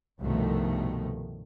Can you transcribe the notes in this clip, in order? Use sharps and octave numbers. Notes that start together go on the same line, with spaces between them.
C2 G2 B2 D#3 F3 A3